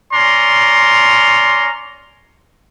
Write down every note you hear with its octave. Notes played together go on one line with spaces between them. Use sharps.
C#4 D5 A#5 C6